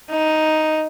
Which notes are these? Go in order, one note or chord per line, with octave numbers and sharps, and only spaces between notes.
D#4